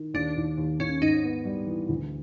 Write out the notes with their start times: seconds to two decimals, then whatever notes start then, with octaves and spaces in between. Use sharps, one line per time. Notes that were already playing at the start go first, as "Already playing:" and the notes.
Already playing: D#3
0.14 D#2 D4
0.37 D#2
0.58 D#2
0.80 D#2 C#4
1.02 G#2 D#4
1.24 B3
1.45 G3
1.67 E3
1.89 D2